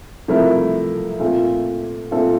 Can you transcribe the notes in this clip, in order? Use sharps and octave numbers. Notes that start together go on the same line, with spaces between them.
C3 F3 A3 E4 A#4
A#2 A3 C4 F4 A4
A#2 A3 C4 F4 A4